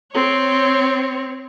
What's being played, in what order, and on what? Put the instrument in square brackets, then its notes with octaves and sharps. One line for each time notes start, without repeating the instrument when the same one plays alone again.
[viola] C4 C#5